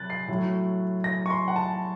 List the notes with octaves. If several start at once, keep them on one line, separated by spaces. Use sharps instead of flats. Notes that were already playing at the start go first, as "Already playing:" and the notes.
Already playing: C3 F#3 F#6 A6
C7
A2 F#3
A#6
C#6
C6
F#5
A5